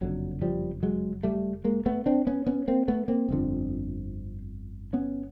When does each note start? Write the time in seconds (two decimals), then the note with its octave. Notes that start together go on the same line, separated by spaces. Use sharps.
0.01 F#1 F2 D3 F#3
0.42 F3 G3
0.83 F#3 G#3
1.23 G3 A3
1.64 G#3 A#3
1.86 A3 B3
2.06 C4 D4
2.27 B3 C#4
2.46 B3 C#4
2.68 A#3 C4
2.88 A3 B3
3.08 A#3 C4
3.29 G1 F2 D3
4.93 B3 C#4